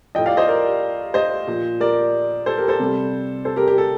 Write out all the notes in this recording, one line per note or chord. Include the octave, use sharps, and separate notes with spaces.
A2 F3 D#5 G5
D5 F5
C5 D#5
A#4 D5
C5 D#5
A#2 F3
A#4 D5
A4 C5
G4 A#4
A4 C5
C3 G3
A4 C5
G4 A#4
G4
A4